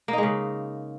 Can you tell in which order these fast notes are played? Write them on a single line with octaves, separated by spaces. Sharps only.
A#3 D#4 G#3 C#3